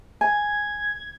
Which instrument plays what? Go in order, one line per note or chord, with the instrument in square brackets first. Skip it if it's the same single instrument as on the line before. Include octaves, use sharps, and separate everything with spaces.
[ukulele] G#5 [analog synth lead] G#6